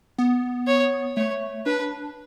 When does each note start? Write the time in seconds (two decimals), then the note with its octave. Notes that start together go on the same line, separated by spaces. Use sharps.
0.18 B3
0.67 C#5
1.17 A3 C#5
1.66 D4 B4